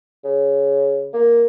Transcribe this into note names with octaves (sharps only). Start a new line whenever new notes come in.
C#3
A#3